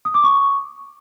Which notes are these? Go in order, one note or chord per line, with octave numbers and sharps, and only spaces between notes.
D#6
D6
C#6